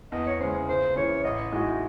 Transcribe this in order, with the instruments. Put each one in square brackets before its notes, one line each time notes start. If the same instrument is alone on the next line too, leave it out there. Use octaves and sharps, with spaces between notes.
[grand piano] E2 [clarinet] D#5
[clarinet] C#5
[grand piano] C#3 G#3 [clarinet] C5
[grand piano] C#2 [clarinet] C5
[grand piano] C#3 E3 [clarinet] C#5
[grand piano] A1 [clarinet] D#5
[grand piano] A2 G#3 D#4 F#4